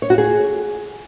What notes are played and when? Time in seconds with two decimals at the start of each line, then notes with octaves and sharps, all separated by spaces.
0.02 C#5
0.10 F#4
0.18 G#4